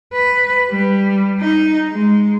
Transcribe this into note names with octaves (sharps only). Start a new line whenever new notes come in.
B4
G3
D#4
G#3